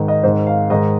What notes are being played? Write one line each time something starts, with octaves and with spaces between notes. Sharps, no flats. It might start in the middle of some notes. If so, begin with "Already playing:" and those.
Already playing: G#2 D#3
D#5
G#2 D#3 C5
F5
G#2 D#3 D#5